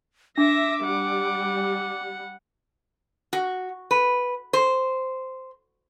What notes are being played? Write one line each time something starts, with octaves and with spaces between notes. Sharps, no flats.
D4 E5 D6 A#6
G3 F#5
F#4
B4
C5